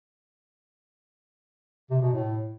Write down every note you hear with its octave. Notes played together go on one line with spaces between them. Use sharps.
C3
B2
A2